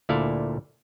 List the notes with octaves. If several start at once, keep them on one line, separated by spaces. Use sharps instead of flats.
D2 A#2 E4 A4 D5 F5